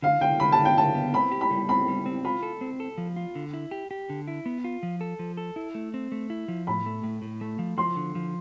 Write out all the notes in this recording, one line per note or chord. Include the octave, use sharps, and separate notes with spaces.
D3 F5
D3 G5
D3 B5
A5
D3
G5
D3 A5
B3
C4 B5
G4
B5
G3
C4 B5
G3
C4
F4 B5
A4
C4
A4
F3
F4
D3
E4
G4
G4
D3
E4
B3
F4
F3
A4
F3
A4
E4
A3
C4
A3
E4
F3
A2 B5
A3
A2
A2
A3
F3
F3 C6
D3
F3